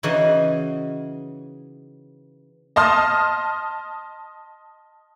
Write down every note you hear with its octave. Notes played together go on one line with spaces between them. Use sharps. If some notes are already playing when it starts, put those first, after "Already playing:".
C#3 E3 D#4 F#4 F5
D#5 A5 C6 D#6 F6